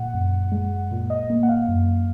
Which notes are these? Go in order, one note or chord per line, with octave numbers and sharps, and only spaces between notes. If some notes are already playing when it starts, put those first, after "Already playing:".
Already playing: A#2 F#5
F#2
G#3
A#2
D#5
A#3
F#5
F5
F#2